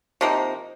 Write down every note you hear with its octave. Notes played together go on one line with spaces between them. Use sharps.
C3 F3 A#3 D#4